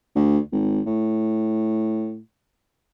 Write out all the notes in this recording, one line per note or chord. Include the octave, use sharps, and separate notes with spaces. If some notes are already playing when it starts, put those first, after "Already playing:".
D2
G#1
A2